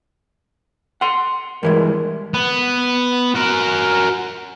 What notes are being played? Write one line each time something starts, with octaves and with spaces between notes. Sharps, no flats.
F#5 C6
G2 E3 G#3 A#4
B3
F#4 A#4